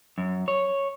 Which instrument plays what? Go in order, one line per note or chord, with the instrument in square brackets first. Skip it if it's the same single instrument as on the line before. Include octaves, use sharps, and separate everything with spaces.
[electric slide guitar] F#2
C#5